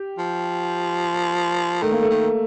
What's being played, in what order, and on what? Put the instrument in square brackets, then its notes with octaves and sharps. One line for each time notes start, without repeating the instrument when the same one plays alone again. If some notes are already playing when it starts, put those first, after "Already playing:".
Already playing: [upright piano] G4
[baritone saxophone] F3
[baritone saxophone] D#3 [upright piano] A3
[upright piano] A#3
A3
[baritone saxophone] D#3